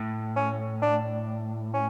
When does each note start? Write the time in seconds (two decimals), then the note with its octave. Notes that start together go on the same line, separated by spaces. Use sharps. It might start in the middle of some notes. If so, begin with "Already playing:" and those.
Already playing: A2
0.36 C#4
0.82 D4
1.73 C#4